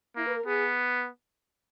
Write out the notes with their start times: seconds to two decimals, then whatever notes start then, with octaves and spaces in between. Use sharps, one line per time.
0.16 A#3 E4
0.26 B4
0.36 A#4
0.46 B3 G#4